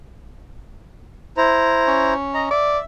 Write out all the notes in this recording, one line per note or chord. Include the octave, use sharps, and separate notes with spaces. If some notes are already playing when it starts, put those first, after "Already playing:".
E4 C5 A#5
C#4
D#5 A#5
D5 E5